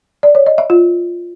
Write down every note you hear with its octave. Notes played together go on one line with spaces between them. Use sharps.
D5
C#5
D#5
E5
F4